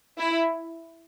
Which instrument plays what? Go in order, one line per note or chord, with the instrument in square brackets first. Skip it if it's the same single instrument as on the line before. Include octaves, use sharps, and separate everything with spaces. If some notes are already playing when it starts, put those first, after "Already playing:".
[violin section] E4